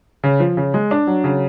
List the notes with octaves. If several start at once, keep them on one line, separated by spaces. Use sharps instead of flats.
C#3
F3
C#3
G#3
D4
F#3
C#3